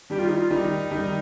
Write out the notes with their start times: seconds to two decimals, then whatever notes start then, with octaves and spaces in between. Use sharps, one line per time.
0.10 D#3 G3 G4
0.19 F4
0.28 D#4
0.36 F4
0.50 D#3 G3 D#4
0.91 D#3 G3